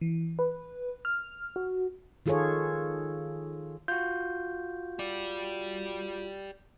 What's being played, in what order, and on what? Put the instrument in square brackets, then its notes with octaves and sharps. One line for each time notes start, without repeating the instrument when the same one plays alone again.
[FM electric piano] E3
B4
F6
F#4
[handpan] D#3 F4 G#4 A4 C#5
[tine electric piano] F4 F#4 [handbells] G6
[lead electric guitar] G4 D5